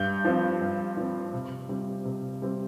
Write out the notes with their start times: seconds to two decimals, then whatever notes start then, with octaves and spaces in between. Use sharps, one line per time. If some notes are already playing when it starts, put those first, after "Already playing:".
Already playing: G2 G6
0.25 F3 C4
0.61 G2
0.97 F3 C4
1.33 C3
1.69 G3 C4
2.05 C3
2.42 G3 C4